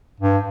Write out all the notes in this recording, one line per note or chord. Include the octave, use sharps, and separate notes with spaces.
G2